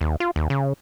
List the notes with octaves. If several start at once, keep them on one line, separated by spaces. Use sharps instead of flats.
D#2
F4
D#2
C#3